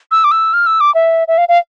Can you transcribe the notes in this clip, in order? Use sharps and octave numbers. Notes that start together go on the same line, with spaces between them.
E6
D6
E6
F6
E6
D6
E5
E5
F5
F5